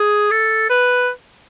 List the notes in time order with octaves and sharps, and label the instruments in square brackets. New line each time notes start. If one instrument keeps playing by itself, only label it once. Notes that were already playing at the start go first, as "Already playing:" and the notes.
Already playing: [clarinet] G#4
A4
B4